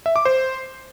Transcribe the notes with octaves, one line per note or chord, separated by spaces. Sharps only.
E5
D6
C5